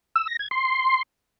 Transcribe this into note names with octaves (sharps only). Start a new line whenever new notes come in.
E6
A#6
G#6
C6